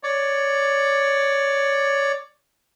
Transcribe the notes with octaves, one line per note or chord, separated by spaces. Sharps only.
C#5 D5